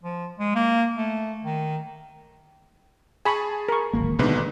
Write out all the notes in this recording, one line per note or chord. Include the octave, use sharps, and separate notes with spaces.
F3
G#3
A#3
A3
D#3
G#4 G#5 A5 B5 C#6
A#4 C#6
D1 G#1 A#3
A#1 G#2 B2 D3 D#3 B4